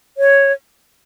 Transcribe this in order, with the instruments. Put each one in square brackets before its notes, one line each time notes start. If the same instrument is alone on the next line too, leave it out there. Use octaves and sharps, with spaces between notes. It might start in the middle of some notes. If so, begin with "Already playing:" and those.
[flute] C#5